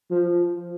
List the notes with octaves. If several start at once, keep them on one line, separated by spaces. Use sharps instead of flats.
F3